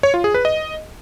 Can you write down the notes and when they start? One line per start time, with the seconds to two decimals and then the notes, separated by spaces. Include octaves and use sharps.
0.03 C#5
0.14 F4
0.24 G#4
0.34 B4
0.45 D#5